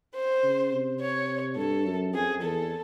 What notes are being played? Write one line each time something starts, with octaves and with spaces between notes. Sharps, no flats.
C5
C#3
C3
C#5
G2 A4
F#2
F2 G#4
E2 A4